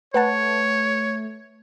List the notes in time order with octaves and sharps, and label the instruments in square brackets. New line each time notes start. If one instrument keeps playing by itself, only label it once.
[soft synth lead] A3 [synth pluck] B4 F#5 A5 [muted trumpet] C#5